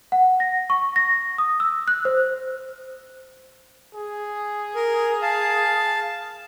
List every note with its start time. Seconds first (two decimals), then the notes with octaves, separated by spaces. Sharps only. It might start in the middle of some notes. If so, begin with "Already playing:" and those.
0.12 F#5
0.40 A#6
0.70 C#6
0.96 A#6
1.38 D#6
1.60 E6
1.88 F#6
2.05 C5
3.95 G#4
4.75 A#4
5.22 F5 A5